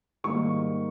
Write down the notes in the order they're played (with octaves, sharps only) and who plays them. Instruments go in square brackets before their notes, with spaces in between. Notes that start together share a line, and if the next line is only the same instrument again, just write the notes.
[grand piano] G#2 D#3 G3 A#3 C#6